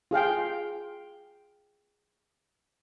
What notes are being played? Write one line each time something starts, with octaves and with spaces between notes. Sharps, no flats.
F4 G#4 F5 G5